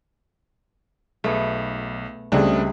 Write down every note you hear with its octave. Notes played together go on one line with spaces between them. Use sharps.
B1 A3 B3 G#4
C#2 G3 A3 C4 D4 G#4 D#5 E5